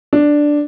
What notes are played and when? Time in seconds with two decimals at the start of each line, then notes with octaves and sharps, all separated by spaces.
0.13 D4